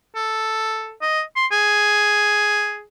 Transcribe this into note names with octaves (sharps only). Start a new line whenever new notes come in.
A4
D#5
C6
G#4